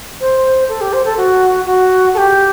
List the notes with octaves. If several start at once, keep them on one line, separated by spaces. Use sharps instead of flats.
C5
A4
G4
C5
A4
F#4
F#4
A4
G4